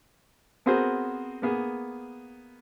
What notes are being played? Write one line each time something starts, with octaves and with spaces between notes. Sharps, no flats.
B3 C4 F#4 G#4 A#4 C5
A#3 B3 G#4